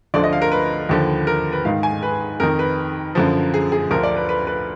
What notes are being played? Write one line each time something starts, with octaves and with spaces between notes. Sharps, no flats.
D2 D3 F3 D5
D#5
F5
A#4
B4
D#2 D3 F3
A#4
B4
G#2 D#3 F5
G#5
B4
F2 D#3 A#4
B4
F#2 D3 F3
G#4
G#4
D2 D3 F3 A#4
D5
B4
B4
B4